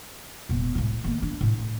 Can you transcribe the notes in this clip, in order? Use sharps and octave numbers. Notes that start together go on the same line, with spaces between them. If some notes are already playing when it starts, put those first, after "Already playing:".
E1 A#2
A2 G#3
D#3 A#3
D4
A2